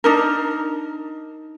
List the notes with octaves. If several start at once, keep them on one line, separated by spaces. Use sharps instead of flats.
D4 D#4 A#4